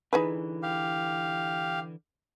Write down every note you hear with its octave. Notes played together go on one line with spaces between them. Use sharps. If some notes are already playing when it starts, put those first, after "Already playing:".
D3 E3 D#4 G#4 B4
G4 F5